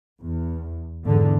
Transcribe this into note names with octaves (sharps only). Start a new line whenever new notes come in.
E2
E2 G#2 D3